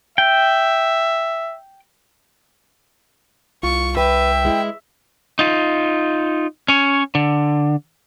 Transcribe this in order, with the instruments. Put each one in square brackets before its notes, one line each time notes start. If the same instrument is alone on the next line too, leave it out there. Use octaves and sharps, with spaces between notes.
[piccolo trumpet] E5 [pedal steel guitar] G5
[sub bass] C2 [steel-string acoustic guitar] F4 [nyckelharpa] C#6
[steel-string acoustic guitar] B4 [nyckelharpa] E5 [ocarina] G5
[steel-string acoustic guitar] G#3 E4
[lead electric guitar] D#4 F4
C#4 C#5
D3